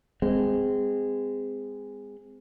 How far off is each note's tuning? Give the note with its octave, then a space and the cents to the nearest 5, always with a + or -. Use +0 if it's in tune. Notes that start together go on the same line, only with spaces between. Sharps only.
G#3 -15 C4 -30